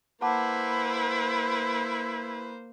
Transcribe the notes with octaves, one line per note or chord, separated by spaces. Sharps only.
A#3 E4 B4 C5 F#5 A5 D6